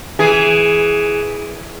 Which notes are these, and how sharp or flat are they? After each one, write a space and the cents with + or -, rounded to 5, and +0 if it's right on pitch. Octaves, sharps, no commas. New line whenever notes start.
E3 +0 G#4 +5